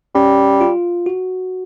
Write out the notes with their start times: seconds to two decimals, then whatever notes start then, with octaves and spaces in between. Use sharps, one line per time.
0.15 G3 C#4
0.61 F4
1.06 F#4